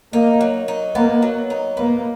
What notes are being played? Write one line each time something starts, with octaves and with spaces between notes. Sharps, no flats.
A#3 D#4
F#3
D#4
A#3 B3
F#3
D#4
A#3 B3